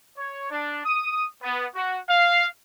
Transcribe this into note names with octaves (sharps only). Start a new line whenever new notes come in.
C#5
D4
D#6
B3
F#4
F5